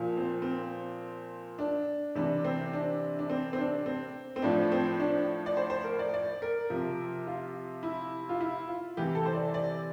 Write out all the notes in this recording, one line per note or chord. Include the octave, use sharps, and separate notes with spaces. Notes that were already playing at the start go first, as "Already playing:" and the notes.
Already playing: A#2 F3
C4
C4
D4
C3 E3 D4
C4
D4
D4
C4
C4
D4
C4
C4
A2 F3 D4
C4
D4
D5
C5
C5
A#4
D5
D5
A#4
C3 F3
F4
E4
F4
E4
F4
C3 E3 G4
A4
C5
D5
D5